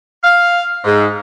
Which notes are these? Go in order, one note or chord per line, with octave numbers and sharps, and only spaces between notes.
F5
G#2